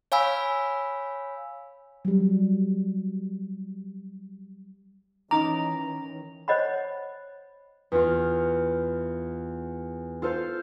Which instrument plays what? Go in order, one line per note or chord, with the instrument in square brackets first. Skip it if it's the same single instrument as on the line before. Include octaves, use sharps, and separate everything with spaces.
[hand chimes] C#5 F5 G#5 B5 E6 B6
[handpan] F#3 G3
[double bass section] D#3 E3 C#4 [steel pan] D#4 D6 [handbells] A#5
[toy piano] C5 C#5 D#5 F#5 B5
[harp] E2 F4
F4 A4 C5 F5